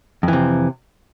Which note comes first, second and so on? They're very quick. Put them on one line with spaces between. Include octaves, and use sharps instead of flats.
F2 E3 C3